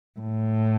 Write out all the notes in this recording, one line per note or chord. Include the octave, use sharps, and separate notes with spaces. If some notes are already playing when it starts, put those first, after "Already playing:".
A2